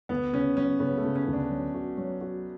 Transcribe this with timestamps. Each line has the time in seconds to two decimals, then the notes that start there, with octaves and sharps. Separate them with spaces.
0.09 D2 B3
0.33 C#3 C#4
0.57 F#3 C#4
0.80 C#3 B3
0.98 A3
1.04 C#3
1.16 C#4
1.27 D2
1.33 D4
1.50 F#3
1.74 F#4
1.97 F#3
2.21 F#4